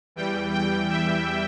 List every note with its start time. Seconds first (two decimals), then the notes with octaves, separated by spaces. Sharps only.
0.16 E2 E3 G3 G5
0.53 G5
0.89 E5